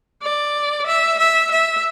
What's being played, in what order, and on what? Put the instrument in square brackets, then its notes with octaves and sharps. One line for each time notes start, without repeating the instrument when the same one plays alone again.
[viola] D5
E5
E5
E5